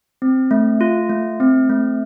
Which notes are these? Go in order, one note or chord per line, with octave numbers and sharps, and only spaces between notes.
C4
A3
F4
A3
C4
A3